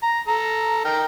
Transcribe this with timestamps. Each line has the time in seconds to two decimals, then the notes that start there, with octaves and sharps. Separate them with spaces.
0.03 A#5
0.28 A4 A#5
0.85 D#4 A#4 G5